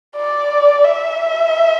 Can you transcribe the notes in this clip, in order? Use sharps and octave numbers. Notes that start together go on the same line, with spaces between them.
D5
E5